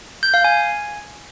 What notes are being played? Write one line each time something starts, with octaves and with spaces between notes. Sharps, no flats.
G6
F5
G#5